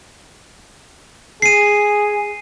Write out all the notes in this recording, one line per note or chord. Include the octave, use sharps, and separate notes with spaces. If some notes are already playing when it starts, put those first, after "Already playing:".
G#4 C7 D#7